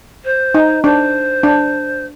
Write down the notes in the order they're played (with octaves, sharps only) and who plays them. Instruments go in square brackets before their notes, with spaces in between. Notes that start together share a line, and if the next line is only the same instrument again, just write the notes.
[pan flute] C5
[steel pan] D#4
[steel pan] D4 [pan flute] C5
[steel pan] D4